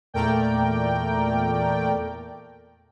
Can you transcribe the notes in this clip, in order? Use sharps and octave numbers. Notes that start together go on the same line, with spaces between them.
E2 A#2 A3 A#4 D5 G5